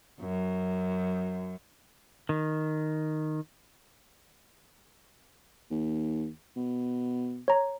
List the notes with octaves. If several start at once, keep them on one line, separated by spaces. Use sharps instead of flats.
F#2
D#3
D#2
B2
C#5 A#5